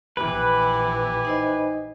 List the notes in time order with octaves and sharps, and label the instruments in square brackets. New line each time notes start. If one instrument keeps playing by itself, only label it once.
[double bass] A#1 E3 [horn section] E4 G4 G#5 [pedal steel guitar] B4
[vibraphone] D#4 C5 D#5